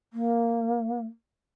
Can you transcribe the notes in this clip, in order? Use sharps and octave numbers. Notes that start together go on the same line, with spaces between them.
A#3